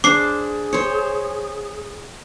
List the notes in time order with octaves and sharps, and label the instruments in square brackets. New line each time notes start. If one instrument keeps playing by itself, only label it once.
[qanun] D4 C5 [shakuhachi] G#4 [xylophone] D6 C7
[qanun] C5 C#5